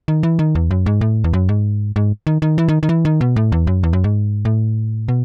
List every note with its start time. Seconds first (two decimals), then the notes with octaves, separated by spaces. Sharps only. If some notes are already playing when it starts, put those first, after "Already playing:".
0.08 D#3
0.23 E3
0.39 D#3
0.55 E2
0.71 F#2
0.86 G#2
1.01 A2
1.24 E2
1.33 F#2
1.49 G#2
1.96 G#2
2.27 D#3
2.42 D#3
2.58 E3
2.68 D#3
2.83 D#3
2.89 E3
3.05 D#3
3.21 B2
3.36 A2
3.52 E2
3.67 F#2
3.83 E2
3.93 F#2
4.04 G#2
4.45 A2
5.08 B2